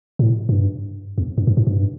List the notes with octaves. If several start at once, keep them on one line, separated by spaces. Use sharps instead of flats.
A2
G2
E2
F#2
G2
G#2
G2